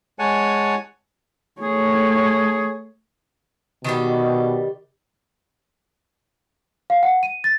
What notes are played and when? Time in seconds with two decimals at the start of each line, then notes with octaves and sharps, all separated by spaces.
0.19 G#3 C#5 F#5 G#5 A5
1.61 A3 G#4 C#5
3.84 B2 D#3 G3 G4
6.90 F5
7.03 F#5
7.23 D#7
7.44 A6